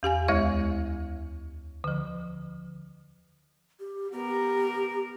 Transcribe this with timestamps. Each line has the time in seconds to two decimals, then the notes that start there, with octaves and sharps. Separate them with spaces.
0.03 E2 G4 F5 G#5
0.28 D2 G#3 E4 C#5 E5
1.84 D3 F3
3.80 G4
4.12 B3 G4 A#4